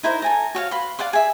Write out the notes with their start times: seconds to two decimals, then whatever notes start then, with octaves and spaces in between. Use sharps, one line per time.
0.03 D#4 E4 A#4 C5
0.22 A4 G#5 A#5
0.55 F#4 C#5 F5
0.71 B4 F5 B5 C6
0.99 D5 F5 F#5 C6
1.13 G#4 E5